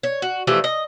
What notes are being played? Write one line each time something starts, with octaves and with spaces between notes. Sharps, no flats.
C#5
F#4
E3 F3 A3 G4
D#5